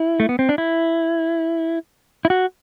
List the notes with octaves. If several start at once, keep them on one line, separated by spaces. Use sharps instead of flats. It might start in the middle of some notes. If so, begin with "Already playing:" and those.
Already playing: E4
A3
B3
C4
D4
E4
E4
F#4